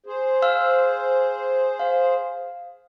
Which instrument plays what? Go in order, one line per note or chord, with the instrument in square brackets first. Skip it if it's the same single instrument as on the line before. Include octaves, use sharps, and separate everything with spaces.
[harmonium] G#4 C5
[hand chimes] F5 E6 F6
F5